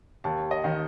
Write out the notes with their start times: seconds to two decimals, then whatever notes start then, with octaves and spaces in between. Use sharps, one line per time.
0.24 D#2 A5
0.51 D#5
0.64 D#3